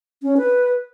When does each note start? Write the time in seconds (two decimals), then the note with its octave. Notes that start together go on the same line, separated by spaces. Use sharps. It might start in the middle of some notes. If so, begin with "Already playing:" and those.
0.22 C#4
0.37 B4